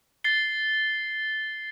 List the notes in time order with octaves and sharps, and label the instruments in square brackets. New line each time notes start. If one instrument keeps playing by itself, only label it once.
[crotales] A6 C7 G7